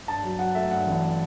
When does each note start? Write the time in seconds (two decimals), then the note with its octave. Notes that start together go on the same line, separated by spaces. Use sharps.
0.07 G2 A5
0.23 F#3
0.39 F#3 F#5
0.55 A3 E5
0.71 G2 F#5
0.86 A1